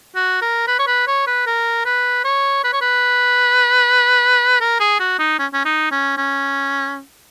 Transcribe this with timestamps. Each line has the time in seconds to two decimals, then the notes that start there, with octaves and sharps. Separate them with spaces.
0.16 F#4
0.42 A#4
0.68 B4
0.79 C#5
0.87 B4
1.08 C#5
1.27 B4
1.47 A#4
1.85 B4
2.25 C#5
2.64 B4
2.73 C#5
2.81 B4
4.61 A#4
4.80 G#4
5.00 F#4
5.19 D#4
5.39 C#4
5.53 C#4
5.65 D#4
5.91 C#4
6.17 C#4